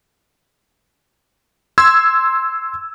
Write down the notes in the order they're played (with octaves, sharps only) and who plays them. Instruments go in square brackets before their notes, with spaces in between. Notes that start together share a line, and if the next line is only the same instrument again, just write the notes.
[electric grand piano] C6 E6 G#6